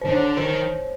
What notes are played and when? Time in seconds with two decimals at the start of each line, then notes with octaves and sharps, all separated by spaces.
0.01 D#3 C5
0.10 D3 C#5
0.37 D#3 C5